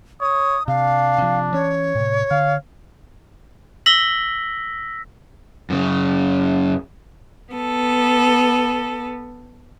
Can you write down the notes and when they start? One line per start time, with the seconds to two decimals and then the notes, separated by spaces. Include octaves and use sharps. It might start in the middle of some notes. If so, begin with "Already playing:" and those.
0.21 C#5 D#6
0.68 C3 D4 F5
1.18 C3 F3
1.53 E3 C#4 C#5
1.95 A2 C3
2.31 D3 F5
3.86 E6 A#6 B6 F#7 G7
5.70 F#2 C#3
7.53 B3 A4